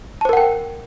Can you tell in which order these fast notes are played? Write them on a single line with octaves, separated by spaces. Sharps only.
A5 C5 A#4 F#5 G5